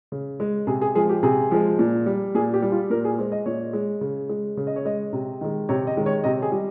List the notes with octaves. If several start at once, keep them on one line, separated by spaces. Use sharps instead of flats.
C#3
G#3
C3 G#4
G#4
F3 G#3 G#4
G4
C3 G#4
F3 G#3
A#2
G3
A#2 G#4
G4
G3
F4
A#2 A#4
G#4
G#3 C5
D#5
A#2 C#5
G#3
C#3
G#3
C#3
D#5
C#5
G#3 D#5
C3
D#3 G#3
C3 C#5
D#5
D#3 G#3
C#5
C3 D#5
G#4
G3